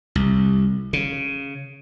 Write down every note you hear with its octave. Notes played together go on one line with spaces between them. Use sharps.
C2
C#3